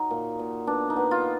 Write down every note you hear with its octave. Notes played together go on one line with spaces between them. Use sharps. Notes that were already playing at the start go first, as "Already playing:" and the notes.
Already playing: F#3 D#4
A#2
A#2
B3 D4
D#4
B3
F4